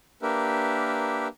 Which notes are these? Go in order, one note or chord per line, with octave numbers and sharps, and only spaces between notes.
A#3 D4 G4 A#4 B4 E5